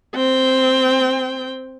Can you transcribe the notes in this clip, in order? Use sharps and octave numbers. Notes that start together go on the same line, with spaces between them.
C4 G5